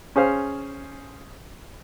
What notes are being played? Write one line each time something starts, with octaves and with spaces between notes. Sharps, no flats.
C#4 G#4 C5 F5